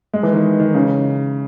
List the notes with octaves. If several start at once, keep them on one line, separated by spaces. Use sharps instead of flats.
G#3
E3
D#3
D#3
C#3